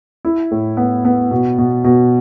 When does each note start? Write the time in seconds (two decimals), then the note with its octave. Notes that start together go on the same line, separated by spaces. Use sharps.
0.25 E4
0.51 A2
0.77 B3
1.05 B3
1.31 B2
1.58 B2
1.84 B2